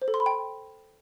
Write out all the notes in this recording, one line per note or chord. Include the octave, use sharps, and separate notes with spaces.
C5
A4
C6
B5
G5